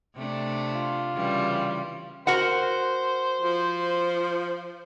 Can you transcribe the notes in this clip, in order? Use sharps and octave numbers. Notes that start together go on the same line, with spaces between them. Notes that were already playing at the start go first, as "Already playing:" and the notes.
C3 A3 D4
F4
C#3 E3 G3
F#4 A#4 C5 F#5
F3